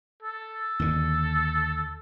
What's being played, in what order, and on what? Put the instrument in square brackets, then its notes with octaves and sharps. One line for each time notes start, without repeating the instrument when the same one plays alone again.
[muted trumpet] A4
[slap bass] D#2 D3